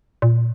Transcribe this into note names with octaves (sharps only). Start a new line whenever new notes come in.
A#2